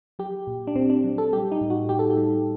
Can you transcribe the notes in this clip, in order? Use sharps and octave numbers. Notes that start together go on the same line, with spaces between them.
F#3 G4
A#2
D4
A#2 C4
D4
F#3
A4
G3 G4
D#4
A2
F#4
A2 G4
A4
G4
G3